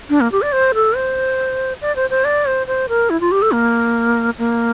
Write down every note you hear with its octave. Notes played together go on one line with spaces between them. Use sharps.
D4
A#3
G4
D5
C5
A4
C5
D5
C5
C5
D5
C5
C5
A#4
E4
F4
G4
A4
A#3
A#3